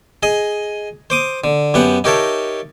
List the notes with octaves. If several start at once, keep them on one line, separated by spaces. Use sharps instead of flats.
G#4 D#5
C5 D6 D#6
D3
F#2 B3 G4 F#5
D#4 G4 A#4 C#5 E5 A5